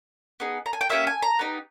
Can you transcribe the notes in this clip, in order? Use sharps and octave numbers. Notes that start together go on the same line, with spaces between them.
B3 D#4 G#4
A#5
G#5
G5
A#3 C#4 G4 E5
G#5
A#5
B3 D#4 G4